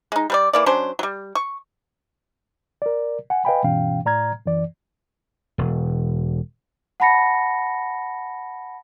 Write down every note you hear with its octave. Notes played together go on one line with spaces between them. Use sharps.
G#3 D#4
G3 B4 D5
E3 A#3 D5
F#3 C#4 D4 C5
F#3 G3
C#6
A#4 D5
F#5 G#5
B4 D#5 F5 G5 G#5 B5
G2 B2 E3 C#4 F5 G5
A2 D5 A#5 F6 G#6
F#2 E3 D5
E1
F#5 A5 B5 A#6 C#7